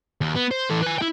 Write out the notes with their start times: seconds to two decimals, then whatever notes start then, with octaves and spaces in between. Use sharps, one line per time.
0.21 D#2
0.35 B3
0.51 C5
0.70 E3 A4
0.82 B4 G#5
0.98 E4 G5